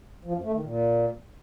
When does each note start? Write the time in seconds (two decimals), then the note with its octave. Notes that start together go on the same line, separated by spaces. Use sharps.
0.25 F3
0.34 F#2
0.44 A3
0.53 D#3
0.63 A#2